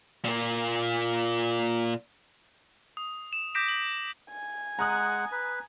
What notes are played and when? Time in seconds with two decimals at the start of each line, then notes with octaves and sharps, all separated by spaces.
0.25 A#2 A#3
2.97 D#6
3.33 E7
3.55 D6 G6 A#6 B6 D7 E7
3.68 F#7
4.31 G#5
4.79 G#3 F#5 A#5 D#6 F#6
5.32 B4